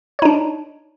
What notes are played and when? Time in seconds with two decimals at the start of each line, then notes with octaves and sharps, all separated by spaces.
0.19 C#5
0.22 D#4
0.25 D4